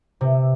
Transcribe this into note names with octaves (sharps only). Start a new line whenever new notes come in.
C3